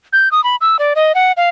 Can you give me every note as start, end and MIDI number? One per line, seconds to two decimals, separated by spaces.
0.13 0.29 91
0.32 0.43 87
0.44 0.56 83
0.61 0.77 88
0.79 0.93 74
0.95 1.12 75
1.15 1.32 78
1.37 1.49 77